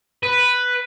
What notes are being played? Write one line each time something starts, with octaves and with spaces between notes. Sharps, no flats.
B4